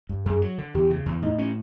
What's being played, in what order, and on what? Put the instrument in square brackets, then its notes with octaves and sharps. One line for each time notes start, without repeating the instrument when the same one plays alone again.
[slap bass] G2
[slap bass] F#2 [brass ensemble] G#4
[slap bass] F#3
D3
[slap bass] E2 [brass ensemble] G4
[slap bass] C#3
E2
[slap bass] A2 [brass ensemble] D#4
[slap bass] C#4